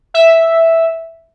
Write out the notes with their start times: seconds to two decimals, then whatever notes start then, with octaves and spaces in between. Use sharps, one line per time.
0.14 E5